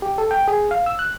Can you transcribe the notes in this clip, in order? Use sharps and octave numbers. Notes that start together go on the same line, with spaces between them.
G4
A4
G5
G#4
F5
E6
F#6